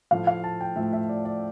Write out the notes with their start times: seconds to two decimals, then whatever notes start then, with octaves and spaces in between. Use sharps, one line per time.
0.11 A2 F3 A3 F5
0.27 F5
0.44 A5
0.61 G5
0.76 A2 F3 A3 E5
0.93 E5
1.09 D5
1.25 D5